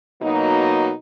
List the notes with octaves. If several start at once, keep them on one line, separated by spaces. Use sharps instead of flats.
B2 F#3 A#3 D#4